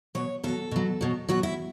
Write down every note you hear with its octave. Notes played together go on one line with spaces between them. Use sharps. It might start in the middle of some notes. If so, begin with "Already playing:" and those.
B2 F#3 C#5
B2 F#3 A4
B2 F#3
B2 F#3
B2 F#3 F#4
E4